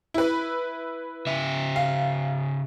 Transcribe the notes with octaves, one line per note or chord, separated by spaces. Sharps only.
E4 B4
C#3 E5
F5